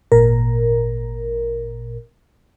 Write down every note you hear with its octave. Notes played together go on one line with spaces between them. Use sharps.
G#1 A#2 A#4